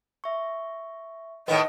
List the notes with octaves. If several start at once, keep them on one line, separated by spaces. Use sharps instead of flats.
E5 C#6
A2 D#3 B3 D#5